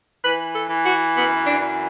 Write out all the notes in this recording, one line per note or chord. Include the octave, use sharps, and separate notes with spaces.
E3 B4
A4
E3
F#4
F#2 B3
D4
E3